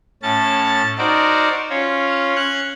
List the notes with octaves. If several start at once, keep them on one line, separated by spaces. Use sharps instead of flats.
A2 C#4 A5 A6
D#4 F#4 A#4 C5 D5
C#4 F4 C#5
C#4 F#6 G#6